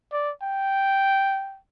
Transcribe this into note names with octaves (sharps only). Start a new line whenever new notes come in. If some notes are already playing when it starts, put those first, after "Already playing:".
D5
G5